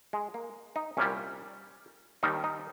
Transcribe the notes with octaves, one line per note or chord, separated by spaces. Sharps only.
G#3
A#3
D#4
C2 A#2 G3 C#4
D#2 D#3 G3 D#4
D#4